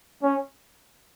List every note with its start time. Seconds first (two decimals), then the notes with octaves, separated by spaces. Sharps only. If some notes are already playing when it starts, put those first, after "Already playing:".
0.23 C#4